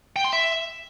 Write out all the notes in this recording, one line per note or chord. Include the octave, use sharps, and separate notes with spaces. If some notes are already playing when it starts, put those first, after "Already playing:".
G5
C6
E5